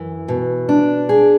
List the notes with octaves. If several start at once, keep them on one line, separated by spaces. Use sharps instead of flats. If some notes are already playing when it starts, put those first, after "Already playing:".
Already playing: F#2 E3
B2
D4
G#4